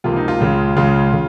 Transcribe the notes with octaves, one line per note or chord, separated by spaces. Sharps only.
C#2 C3 F3 A#3 F4
D#4
F4
C#2 C#3 G#3
C#2 C#3 G#3 F4
C#3